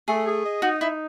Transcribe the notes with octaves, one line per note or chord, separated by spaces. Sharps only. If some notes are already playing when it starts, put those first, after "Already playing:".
A3 G#4
G#4
D#5
D#4 F#4
D#4 E4